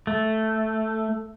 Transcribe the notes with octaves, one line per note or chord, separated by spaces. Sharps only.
A3